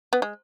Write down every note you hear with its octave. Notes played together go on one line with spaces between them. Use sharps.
B3
G#3